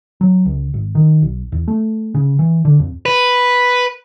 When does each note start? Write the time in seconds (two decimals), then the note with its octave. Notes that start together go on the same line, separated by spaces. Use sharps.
0.21 F#3
0.46 C#2
0.74 G#1
0.95 D#3
1.22 B1
1.52 E2
1.68 A3
2.15 C#3
2.39 E3
2.65 D3
2.79 F2
3.06 B4